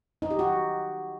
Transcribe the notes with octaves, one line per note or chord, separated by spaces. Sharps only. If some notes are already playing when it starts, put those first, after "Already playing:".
D#4
G4
F#4